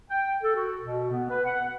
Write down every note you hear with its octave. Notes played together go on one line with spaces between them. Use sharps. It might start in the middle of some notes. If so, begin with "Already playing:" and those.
G5
A4
F#4
B2
B3
B4
F#5